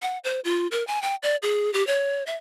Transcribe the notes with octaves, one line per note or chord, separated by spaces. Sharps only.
F#5
C5
F4
A#4
G#5
G5
D5
G#4
G4
C#5
E5